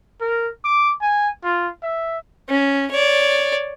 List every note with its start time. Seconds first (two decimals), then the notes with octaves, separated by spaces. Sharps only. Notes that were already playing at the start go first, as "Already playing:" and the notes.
0.21 A#4
0.64 D6
1.01 G#5
1.44 F4
1.83 E5
2.49 C#4
2.91 C#5 D5